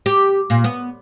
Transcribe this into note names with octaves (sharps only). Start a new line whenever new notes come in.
G4
A#2
B3